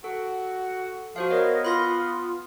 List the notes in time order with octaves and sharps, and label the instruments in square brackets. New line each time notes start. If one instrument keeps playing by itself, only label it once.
[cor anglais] F#4 [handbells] A4
[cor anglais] F3 [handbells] F#4 C5 F5
[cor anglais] B3 [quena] A#4 [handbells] C#5 D#5
[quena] F4 [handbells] B5 C6 A#6